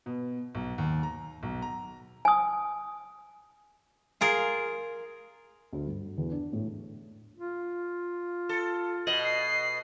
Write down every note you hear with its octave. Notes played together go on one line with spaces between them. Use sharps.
B2
B1
D#2
A#5
B1
A#5
G#5 D#6
F4 G#4 A#4
D2
G2
E2
D4
A2
F4
A4
B2 D#5 F#7
C7